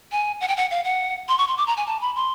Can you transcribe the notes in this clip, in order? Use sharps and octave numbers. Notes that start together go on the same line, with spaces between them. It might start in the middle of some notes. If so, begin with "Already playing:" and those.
G#5
F#5
G5
F#5
F5
F#5
C6
C#6
C6
D6
A#5
G#5
A5
B5
C6